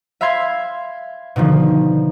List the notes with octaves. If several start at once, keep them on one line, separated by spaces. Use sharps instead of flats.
E5 F5 B5 C6 G#6
B2 D3 D#3 F3